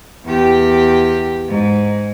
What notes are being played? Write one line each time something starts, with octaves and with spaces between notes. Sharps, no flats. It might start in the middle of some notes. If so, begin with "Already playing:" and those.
E2 G4
G#2